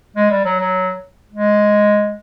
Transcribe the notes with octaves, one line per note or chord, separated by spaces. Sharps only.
G#3
G3
F#3
F#3
G#3